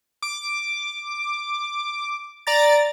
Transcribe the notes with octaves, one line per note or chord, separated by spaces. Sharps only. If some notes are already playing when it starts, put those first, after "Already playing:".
D6
D5 A#5 A6